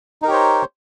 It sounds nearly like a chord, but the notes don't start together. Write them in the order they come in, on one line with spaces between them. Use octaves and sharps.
D#4 A#4 G4 C#5 C5